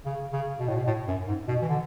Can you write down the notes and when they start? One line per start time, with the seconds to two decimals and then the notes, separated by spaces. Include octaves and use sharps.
0.06 C#3
0.33 C#3
0.59 B2
0.68 A2
0.77 B2
0.87 A2
1.08 F#2
1.27 G#2
1.48 B2
1.62 E3
1.69 D3